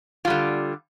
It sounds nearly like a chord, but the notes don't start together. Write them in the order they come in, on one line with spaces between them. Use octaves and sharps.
F4 G3 D3